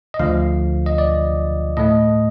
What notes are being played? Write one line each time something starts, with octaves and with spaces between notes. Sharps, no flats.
D#5
D2 D3 F3 F5
D#5
D5
A2 A3 D#5